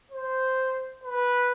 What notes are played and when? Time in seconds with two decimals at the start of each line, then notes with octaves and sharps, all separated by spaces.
0.12 C5
1.04 B4